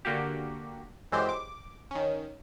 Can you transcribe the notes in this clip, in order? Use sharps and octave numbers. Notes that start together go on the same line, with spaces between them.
D3 A#3 F#4 G4
F#2 E3 G#3 C4 G4 C5
D6
D#3 C#4